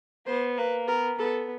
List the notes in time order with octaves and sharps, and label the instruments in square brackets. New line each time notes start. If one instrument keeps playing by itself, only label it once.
[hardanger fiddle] B3 [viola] C5
[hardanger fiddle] A#3 [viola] B4
[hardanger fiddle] B3 [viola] A#4
[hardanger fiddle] B3 [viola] A4